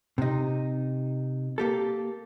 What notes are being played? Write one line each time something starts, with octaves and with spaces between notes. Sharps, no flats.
C3 D#4
A#3 G4 A4